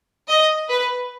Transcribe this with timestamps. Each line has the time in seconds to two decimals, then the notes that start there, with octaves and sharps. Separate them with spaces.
0.30 D#5
0.70 B4